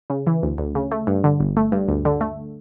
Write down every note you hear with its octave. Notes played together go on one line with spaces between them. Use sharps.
C#3
E3
D2
D2
C#3
A3
G2
D3
G1
A3
G2
D2
D3
A3